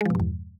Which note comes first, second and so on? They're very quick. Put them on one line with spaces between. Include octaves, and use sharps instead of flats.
G#3 F3 B2 G2 E2